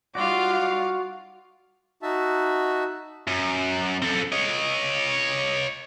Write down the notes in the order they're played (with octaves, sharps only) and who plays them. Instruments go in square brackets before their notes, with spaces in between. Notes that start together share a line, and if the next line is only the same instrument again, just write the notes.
[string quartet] G3 D#4 F4 [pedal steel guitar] F#4 D5 [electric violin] F5 D6
[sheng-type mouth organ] D#4 F#4 E5 A5
[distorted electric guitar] F#2
C4 A4
C#5 D#5